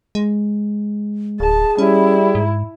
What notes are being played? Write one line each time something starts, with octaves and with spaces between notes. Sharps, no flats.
G#3
D1 G#4 A5
G3 C#4 E4
G#2